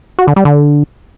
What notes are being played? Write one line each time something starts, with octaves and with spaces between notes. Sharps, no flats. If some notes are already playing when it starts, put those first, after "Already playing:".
F#4
D3
G3
D3